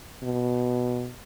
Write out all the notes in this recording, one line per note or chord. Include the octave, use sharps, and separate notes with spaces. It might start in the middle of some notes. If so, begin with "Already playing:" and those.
B2